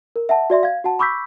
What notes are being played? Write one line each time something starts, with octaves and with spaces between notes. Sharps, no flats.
A#4
E5 F#5 A5
F#4 D5 E5 C6
F5 G#6
F#4 F#5 A5
B5 C#6 D6 E6 G6 B6